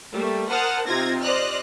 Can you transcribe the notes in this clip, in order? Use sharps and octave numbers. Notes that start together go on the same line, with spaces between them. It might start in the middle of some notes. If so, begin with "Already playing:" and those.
G3 A3 A#3
A#4 C5 F#5 A5 D#6 F6
C3 C4 D#4 F4 G#6 A#6
C5 D5 D#5 F6 F#6